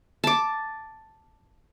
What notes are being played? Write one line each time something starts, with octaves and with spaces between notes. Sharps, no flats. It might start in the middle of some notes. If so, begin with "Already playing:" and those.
A5 D6